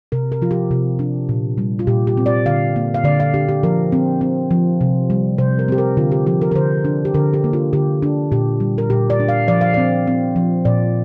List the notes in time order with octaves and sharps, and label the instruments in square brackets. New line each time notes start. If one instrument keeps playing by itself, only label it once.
[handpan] C3 A#4
A#4
F3 F4
G4
C3
D4
A#2
G3
F4
A#2 G4
G4
C4
D5
D3 F5
A#3
F5
D3 D5
F5
D4 G4
G4
F3 A#4
C4
C4
F3
C3
G3
C3 C5
A#4
C4 G4
A#4
D3 F4
G4
F3 G4
A#4
A#4
D3 C5
D4
G4
D3 A#4
G4
A#3
F4
D3 G4
D4
A#2 G4
G3
A#4
A#2 G4
D5
D4
F5
F3 D5
F5
C4 D5
C4
F3
A#2 D5